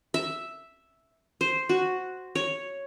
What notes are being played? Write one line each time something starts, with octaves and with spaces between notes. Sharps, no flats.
E5
C5
F#4
C#5